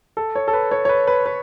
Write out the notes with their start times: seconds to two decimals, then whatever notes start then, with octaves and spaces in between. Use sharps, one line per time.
0.17 A4
0.35 C#5
0.48 A4
0.53 B4
0.71 C#5
0.85 C#5
0.89 B4
1.07 B4
1.26 B4